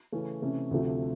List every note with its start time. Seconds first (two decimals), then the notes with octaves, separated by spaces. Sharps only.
0.12 C#3 E3 A3 C#4
0.42 C3 E3 A3 C#4
0.71 D2 C3 F3 A3